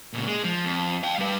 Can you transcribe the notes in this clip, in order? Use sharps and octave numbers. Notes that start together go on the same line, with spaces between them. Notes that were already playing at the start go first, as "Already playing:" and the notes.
A#2 C#3
G#3
F3
F2
F5 G5
G3 B4